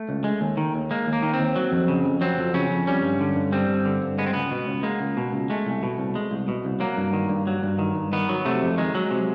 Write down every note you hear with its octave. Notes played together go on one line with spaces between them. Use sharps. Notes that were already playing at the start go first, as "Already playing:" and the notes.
Already playing: A3
C#2
G#3
D#2
D#3
D#2
G#3 A#3
D#2
A#3
D#3
C4
D#2
F#3
F2
C#3
F2
F#3 C4
F2
C#3 C#4
F2
G3 C#4
G2
D3
G2
G3 C4
G2
D3
G2
G#3 B3
C4
C#2 B3
B2
C#2
G#3 A#3
C#2
B2
C#2
G#3 A3
C2
B2
C2
G#3
C2
B2
C2
F#3 A#3
G2
D#3
G2
F#3
G2
D#3
G2
D#3 B3
F#3
C3 A3
F2
D#3 G#3
F#3
C3